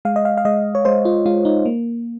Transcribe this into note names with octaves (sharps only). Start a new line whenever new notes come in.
G#3 F5
D#5
F5
F5
G#3 D#5
C#5
G#3 C5
F4
G#3 F4
D#4
A#3